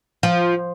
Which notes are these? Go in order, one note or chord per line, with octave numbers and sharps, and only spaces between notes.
F3